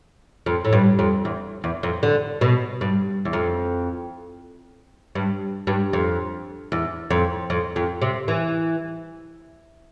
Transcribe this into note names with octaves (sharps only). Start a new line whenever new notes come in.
F2
A2
G2
F2
E2
E2
F2
D3
B2
G2
E2
F2
G2
G2
F2
E2
F2
F2
F2
C3
E3